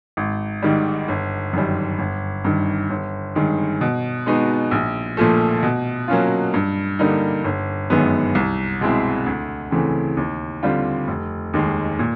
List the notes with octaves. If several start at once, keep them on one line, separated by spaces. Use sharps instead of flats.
G#1
G#2 D#3 G3
G1
F#2 D#3 G3
G1
G2 D#3
G1
G2 D#3 G#3
B2
G#3 B3 D#4 F#4
A#1
A#2 F3 A3
B2
F#3 A#3 C#4 F4
G2
D3 G3 A#3 D#4
G1
F#2 D#3 G#3 B3
C2
B2 G#3 C4 E4
D2
C#3 E3 A3 C4
D#2
D3 G3 C4 F4
F1
D#2 D#3 G#3
A#2